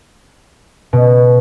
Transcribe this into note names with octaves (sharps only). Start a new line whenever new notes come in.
B2